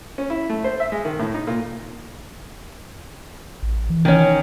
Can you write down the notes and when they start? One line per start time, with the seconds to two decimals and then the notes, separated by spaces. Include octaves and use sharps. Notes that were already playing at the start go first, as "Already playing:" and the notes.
0.18 C#4
0.30 E4
0.49 A3
0.64 C5
0.80 E5
0.92 G#3
1.05 D#3
1.19 A2
1.34 D#4
1.47 A#2
3.62 A1
3.90 E3
4.05 D#3 C#4